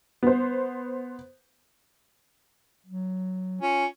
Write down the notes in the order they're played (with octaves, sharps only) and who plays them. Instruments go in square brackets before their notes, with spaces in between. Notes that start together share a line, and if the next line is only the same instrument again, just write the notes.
[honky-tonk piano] B3 C5
[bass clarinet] F#3
[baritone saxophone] C#4 [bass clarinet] F4